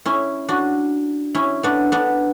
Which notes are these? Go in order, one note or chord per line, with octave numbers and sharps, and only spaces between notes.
C#4 E4
D4 F#4
C#4 E4
B3 D4
B3 D4